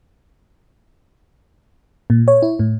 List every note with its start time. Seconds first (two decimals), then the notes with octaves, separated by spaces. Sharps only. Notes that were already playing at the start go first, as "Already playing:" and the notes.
2.10 A#2
2.28 C#5
2.42 E4
2.59 A2